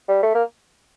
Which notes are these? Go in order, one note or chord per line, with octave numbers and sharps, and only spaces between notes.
G3
A3
A#3